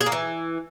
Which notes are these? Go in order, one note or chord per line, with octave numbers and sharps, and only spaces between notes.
G#4
A#3
E3